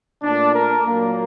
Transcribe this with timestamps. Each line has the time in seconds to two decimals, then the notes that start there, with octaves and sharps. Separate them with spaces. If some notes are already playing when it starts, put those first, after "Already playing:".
0.23 A#2 A3 D4
0.55 A#4
0.87 A#2 F#3 A#3